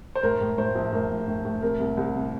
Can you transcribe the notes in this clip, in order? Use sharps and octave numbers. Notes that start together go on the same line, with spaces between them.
C5
A2 A#4
A2
A2 C5
A#1
A2 A#4
A#1
A2
A2
C3 A#4
C2
C2
C3